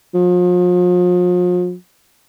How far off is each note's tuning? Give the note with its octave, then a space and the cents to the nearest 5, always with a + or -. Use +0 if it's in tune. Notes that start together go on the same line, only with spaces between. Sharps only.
F3 +40